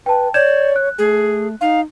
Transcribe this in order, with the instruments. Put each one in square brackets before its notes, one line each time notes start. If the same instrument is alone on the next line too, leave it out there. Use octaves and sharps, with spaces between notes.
[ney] B4 [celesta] G5 A5
[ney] C#5 [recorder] D5 [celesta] G6 G#6 E7
[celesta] F#6
[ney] A3 [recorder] G#4
[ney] D#4 [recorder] F5